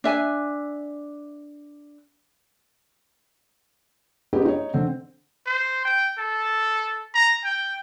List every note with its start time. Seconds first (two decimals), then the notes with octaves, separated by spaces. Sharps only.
0.04 D4 E5 G#5
4.33 B3 C#4 D#4 G4 G#4
4.45 D#4 C#5
4.74 D3 C4
5.46 C5
5.85 G5
6.19 A4
7.14 A#5
7.45 G5